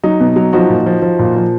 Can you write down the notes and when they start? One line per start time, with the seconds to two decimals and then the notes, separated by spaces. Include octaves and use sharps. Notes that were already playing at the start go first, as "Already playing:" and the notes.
0.04 F#3 D#4
0.20 B2
0.36 F#3
0.53 F3 D#4 F#4
0.70 A#2
0.86 F3
1.02 F3
1.19 A#2
1.36 F3